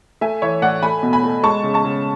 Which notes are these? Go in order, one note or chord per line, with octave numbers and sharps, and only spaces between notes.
A3 E5 G#5
E3 C#5 E5
A2 D5 F#5
A3 G#5 B5
B2
G#5 B5
A3
G#3 A5 C#6
C#3
A5 C#6
C#3